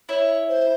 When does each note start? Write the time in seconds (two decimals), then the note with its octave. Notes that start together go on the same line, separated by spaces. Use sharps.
0.09 E4 C#5
0.49 C5